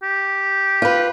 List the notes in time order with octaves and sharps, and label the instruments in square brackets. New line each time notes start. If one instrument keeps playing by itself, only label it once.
[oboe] G4
[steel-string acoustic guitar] F4 B4